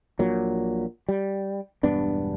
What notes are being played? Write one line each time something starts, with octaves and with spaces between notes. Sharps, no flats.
A#1 A#2 F#3
G3
E1 G2 B3 D4